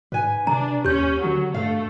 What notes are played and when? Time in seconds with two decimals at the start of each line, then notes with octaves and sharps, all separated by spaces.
0.12 G#2 B4 G#5
0.47 C3 D4 A#5
0.85 D#2 C#4 G4 G6
1.23 D3 F#3
1.54 G2 A3 F5